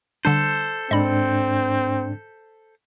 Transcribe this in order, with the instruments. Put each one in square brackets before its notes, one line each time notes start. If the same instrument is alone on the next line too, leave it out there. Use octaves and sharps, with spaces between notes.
[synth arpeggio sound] D3 G3 D4 [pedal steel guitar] A4 C5
[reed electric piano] G#2 D4 [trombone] C4 [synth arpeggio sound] D#5 B5